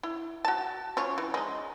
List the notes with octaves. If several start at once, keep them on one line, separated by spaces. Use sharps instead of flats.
E4
F#4 A5
C#4 F4 C#5
E3
G#3 D#4